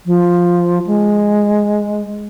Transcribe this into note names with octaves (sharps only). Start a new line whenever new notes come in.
F3
G#3